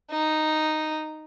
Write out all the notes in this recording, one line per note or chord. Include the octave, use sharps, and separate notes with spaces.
D#4